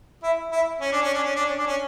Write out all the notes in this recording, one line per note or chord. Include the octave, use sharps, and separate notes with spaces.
E4
E4
C#4
D4
C#4
D4
C#4
D4
C#4
D4
C#4